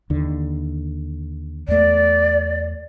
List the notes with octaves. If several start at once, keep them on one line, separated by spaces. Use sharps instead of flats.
D#2 D3
E2 A3 D5